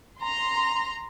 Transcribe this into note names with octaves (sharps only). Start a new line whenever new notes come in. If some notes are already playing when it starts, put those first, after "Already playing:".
A#5 C6